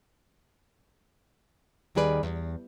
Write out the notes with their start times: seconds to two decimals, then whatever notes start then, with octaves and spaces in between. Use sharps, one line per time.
1.95 D#2 D#3 G3 G#4 B4 D5
2.23 E2